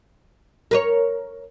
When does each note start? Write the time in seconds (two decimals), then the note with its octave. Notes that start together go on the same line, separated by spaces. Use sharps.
0.71 A#4 B4 C#5